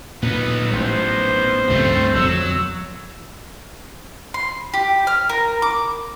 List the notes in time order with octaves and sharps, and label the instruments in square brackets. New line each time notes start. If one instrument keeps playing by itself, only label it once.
[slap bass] D2 A#2 [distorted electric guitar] B3 D#4
[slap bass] A1 G#3 [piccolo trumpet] C5
[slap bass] C#2 G2 F3 [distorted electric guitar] A3 C4
[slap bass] E1 F2 D3 [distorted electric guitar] F#3 [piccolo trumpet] E6
[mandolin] C6
G4
F6
A#4
D6